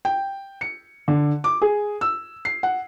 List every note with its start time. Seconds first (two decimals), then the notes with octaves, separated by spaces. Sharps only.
0.05 G5
0.61 C#7
1.08 D3
1.44 D6
1.62 G#4
2.01 E6
2.45 C7
2.63 F#5